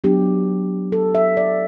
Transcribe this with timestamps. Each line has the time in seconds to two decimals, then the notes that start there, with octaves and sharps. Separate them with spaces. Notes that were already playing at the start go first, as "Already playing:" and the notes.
0.04 F#3 B3 D4 G4
0.92 A4
1.15 E5
1.37 D5